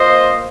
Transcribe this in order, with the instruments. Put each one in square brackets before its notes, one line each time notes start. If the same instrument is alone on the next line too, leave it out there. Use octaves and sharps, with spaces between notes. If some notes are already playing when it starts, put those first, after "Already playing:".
Already playing: [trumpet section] A#3 F4 C5 D#5